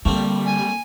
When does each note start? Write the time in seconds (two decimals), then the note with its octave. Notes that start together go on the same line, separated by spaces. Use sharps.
0.05 D3 G3 A3 A#3 C4
0.45 G#5